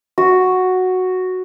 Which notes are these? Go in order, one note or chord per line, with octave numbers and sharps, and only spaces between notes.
F#4